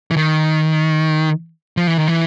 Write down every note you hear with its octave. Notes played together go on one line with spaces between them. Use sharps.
E3
D#3
F3
E3
D#3
E3